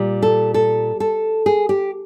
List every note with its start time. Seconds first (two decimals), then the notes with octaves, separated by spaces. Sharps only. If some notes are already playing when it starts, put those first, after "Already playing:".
Already playing: A#2 G3
0.22 A4
0.54 A4
1.00 A4
1.46 G#4
1.69 G4